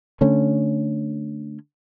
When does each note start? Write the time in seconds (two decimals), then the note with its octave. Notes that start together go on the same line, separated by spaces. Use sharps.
0.21 D3 A3 C#4